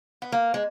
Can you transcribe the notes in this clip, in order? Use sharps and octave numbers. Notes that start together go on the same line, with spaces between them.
B3
A#3
G#3